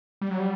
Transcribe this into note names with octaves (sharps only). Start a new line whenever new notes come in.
G3
F#3
G3